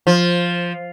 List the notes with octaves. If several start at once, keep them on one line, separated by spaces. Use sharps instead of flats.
F3